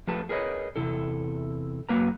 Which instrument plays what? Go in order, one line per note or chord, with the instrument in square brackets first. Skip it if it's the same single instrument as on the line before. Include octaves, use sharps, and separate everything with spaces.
[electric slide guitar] F3 A3 G4 B4 A5
G#4 A#4 B4 C#5 D#5
E2 C3 E4 A4
F#2 F#3 A#3 B4 A#5